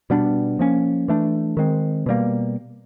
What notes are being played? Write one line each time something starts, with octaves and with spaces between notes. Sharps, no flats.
B2 G3 B3 D4
F3 A#3 C#4
E3 A3 D4
D#3 G#3 C4
B2 G3 A#3